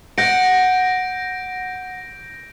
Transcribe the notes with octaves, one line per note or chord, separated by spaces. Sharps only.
F#5 G6 A#6 D7